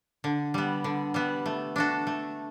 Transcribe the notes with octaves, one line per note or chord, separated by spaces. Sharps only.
D3
G3 B3
D3
G3 B3
A3
D4 F#4 A4
A3